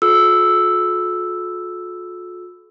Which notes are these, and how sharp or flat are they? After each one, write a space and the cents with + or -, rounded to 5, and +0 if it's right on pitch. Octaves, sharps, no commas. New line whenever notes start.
F4 +45 A4 -40 E6 +0